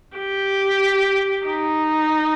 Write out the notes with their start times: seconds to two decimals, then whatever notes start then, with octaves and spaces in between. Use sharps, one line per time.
0.17 G4
1.46 D#4